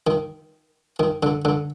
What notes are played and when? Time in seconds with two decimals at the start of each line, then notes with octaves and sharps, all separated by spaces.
0.07 D#3
1.00 D#3
1.23 D3
1.45 D3